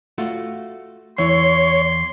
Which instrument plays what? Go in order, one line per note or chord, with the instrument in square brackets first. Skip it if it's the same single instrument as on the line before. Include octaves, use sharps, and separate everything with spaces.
[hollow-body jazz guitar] A3 F4 F#4
[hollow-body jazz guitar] E2 E3 E4 [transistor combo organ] C#5 [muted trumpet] C6